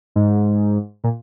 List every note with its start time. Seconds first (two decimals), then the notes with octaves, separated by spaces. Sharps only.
0.16 G#2
1.04 A#2